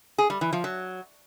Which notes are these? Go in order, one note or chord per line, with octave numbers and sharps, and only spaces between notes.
G#4
G3
E3
F3
F#3